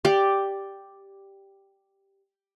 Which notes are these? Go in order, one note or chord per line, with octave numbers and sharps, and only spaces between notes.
G4 D5